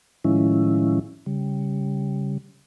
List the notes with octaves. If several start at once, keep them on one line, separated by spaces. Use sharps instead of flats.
A2 D#3 F3 G#3 C#4 E4
C#3 G3